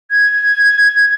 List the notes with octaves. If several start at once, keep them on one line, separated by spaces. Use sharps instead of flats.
G#6